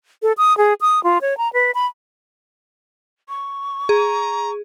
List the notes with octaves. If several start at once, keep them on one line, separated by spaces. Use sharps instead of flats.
A4
D#6
G#4
D#6
F4
C#5
A#5
B4
B5
C#6
G#4 A#5